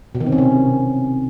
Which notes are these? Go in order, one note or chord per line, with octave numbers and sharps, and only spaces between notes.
B2
D#3
C4
C#4
C3